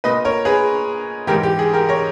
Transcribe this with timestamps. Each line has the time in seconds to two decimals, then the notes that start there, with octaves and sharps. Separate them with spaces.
0.04 A#2 B4 D#5
0.25 A#4 C#5
0.45 G#4 B4
1.27 G#2 E3 G4 A#4
1.43 G4
1.59 G#4
1.73 G4 A#4
1.89 A#4 C#5